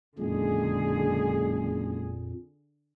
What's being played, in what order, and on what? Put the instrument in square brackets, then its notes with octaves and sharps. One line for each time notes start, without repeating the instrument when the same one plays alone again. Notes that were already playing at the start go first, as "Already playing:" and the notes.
[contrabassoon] F#1 [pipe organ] F2 A#2 [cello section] D3 G#4 [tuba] G#3